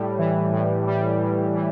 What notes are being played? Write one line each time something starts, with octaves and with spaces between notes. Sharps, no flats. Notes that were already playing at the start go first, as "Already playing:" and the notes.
Already playing: A2 G3
E3
A2
G3
A2
E3